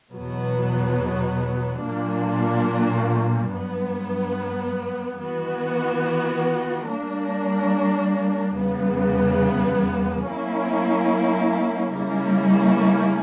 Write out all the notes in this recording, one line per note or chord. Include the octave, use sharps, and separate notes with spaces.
E2 B2 F#3 B3
A#2 F#3 A#3 D4
G2 F#3 B3
E3 B3 F#4
G3 A#3 D4 A#4
E2 C#3 G3 B3
F#3 A#3 C#4 E4
C#3 G3 A#3 C#4 E4